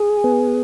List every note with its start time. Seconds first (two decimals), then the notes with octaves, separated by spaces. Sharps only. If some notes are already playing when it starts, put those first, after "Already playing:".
Already playing: G#4
0.24 B3